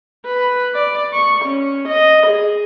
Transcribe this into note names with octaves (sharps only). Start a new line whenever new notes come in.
B4
D5
C#6
C#4
D#5
G#4